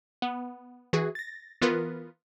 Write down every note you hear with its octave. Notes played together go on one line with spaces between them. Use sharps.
B3
E3 F#4 G#4
A6 A#6
E3 B3 F4 A#4 B4